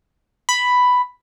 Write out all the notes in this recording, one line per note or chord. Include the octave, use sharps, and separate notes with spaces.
B5